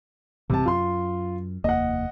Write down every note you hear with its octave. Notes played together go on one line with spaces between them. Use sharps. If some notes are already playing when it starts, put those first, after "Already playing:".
A1 G2 C3 A5
F#2 F4 C6
F1 D#2 A#3 D#5 F#5